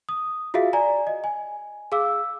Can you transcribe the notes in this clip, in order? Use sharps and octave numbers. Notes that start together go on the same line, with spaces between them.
D#6
F4 F#4 G#4 E5 F5
D5 G#5 A#5
D#5
G#5
G#4 F5 D6 E6